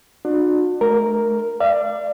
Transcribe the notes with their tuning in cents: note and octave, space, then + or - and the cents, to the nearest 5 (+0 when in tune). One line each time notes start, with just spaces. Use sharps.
D4 +30 F#4 -40
A3 -35 A#4 +0
D5 +15 F5 -40